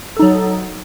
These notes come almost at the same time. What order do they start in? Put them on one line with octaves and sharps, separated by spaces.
A4 D#4 F#3